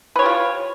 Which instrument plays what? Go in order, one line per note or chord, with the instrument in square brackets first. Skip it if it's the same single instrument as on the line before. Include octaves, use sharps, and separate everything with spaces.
[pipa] B4
C#5
G4
F4